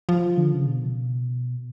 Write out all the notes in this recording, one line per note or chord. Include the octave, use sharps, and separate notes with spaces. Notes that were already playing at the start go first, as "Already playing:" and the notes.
F3
D3
C#3
B2